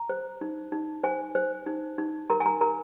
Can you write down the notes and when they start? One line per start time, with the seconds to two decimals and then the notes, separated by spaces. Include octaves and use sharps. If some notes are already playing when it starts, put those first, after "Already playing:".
Already playing: A#5
0.09 C5
0.41 D#4
0.72 D#4
1.04 C5 G#5
1.35 C5
1.66 D#4
1.98 D#4
2.30 A#4 A#5
2.40 G#5
2.46 A#5
2.61 A#4 A#5